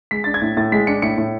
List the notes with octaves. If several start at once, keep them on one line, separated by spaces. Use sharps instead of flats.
G#3 B6
D4 A6
G#6
A2
A2 A6
G#3 B6
D4 C#7
A2 C#7
A2